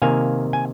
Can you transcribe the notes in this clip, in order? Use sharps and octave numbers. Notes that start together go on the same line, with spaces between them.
C3 D#3 A#3 F5 G#5
G#5